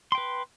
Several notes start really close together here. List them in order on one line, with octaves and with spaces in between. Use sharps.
C6 G5 B4